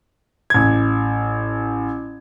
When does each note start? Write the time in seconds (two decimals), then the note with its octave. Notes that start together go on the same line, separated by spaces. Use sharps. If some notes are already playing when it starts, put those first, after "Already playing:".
0.50 A1 G#6